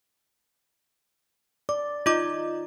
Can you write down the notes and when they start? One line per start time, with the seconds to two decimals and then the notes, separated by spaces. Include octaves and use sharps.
1.69 D5 D6
2.06 D#4 F4 D#5 D6